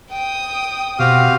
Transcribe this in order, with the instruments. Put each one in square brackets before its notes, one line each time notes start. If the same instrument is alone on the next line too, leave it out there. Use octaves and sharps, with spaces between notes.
[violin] G5 D#6
[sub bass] B2 [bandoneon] C4 F#4 G4 [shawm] F5